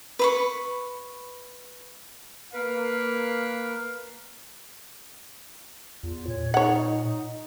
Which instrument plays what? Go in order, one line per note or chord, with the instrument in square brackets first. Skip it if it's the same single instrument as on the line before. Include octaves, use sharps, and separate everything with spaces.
[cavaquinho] B4 B5 C#6
[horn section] A#3 A#4 B4 F5
[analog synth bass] E2 [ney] F4
[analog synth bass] A#2 [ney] C#5
[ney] D#4 [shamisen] C#5 F#5